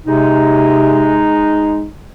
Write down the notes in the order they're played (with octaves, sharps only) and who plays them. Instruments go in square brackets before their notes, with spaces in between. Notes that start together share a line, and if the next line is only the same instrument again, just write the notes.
[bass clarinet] C3 [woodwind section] G#3 D#4